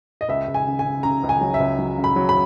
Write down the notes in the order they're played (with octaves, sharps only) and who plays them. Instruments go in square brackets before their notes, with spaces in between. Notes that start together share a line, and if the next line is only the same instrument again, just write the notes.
[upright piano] D#5
C#2 E5
C#2
G#5
C#3
G#5
C#3
C#3 A#5
C#2
G#5
F#3
E5
C#2
F#3
C#3
B5
F#3
B5